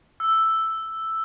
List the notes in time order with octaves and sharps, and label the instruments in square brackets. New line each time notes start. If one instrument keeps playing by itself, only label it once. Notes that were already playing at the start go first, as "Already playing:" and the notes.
[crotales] E6